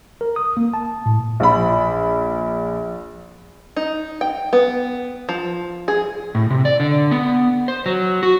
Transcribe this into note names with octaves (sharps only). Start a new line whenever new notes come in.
A#4
D#6
A#3
A5
A2
A#1 B5
D#4
G5
B3
F3
G#4
A2
C3
D5
D3
B3
C5
F#3
F#4